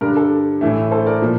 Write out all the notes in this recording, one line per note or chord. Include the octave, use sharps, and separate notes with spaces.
G2 D3 G3 D4 A#4
A4
A1 A2 E3 A3
A4 C5
A#4 D5
A#2 F3